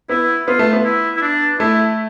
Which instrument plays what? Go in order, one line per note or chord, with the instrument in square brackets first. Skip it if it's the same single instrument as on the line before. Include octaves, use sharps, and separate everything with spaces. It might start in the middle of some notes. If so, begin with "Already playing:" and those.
[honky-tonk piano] B3 [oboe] E4
[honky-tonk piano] B3 [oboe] F4
[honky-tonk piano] A3
B3
[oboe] E4
E4
D4
[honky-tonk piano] A3 [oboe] E4